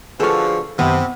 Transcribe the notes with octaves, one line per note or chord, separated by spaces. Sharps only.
B2 D3 F3 G#4 A4 F5 C#6
F#2 C3 D#3 B3